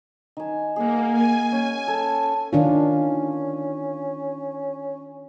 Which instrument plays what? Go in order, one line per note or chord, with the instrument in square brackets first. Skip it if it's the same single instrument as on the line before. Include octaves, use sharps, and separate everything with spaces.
[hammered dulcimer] D#3 G#5
[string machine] A#3 [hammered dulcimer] G#4 F#5
[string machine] G#5
[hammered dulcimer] C#4
A4
[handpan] D#3 D4 F4 [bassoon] C#4